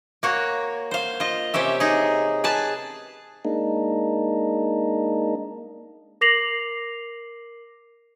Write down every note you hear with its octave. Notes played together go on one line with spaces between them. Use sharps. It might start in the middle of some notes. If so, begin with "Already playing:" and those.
A#3 F#4 C#5
C5 F5
F4 D#5
C3 C#4 G4 E5
D#4 G#4
G#4 B4 G#5 A5
G#3 A#3 D4 D#4
A#4 D6 A#6 C7 F7 F#7